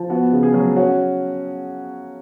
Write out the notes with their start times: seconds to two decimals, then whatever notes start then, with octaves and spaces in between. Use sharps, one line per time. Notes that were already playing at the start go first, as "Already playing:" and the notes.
Already playing: F3
0.10 B3 F#4
0.32 C#3
0.43 G#4
0.54 F#3
0.77 C#4 F#4